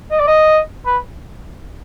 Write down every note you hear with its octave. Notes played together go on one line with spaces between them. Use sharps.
D#5
D5
D#5
B4